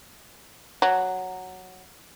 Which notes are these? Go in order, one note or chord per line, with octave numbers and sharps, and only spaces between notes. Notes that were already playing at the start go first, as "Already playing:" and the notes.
F#3